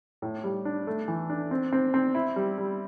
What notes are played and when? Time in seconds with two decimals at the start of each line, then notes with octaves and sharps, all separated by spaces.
0.22 A2
0.44 G3
0.65 D4
0.87 A3
1.08 E3
1.30 D4
1.51 C4
1.72 C4
1.94 C4
2.15 E4
2.36 G3
2.58 G3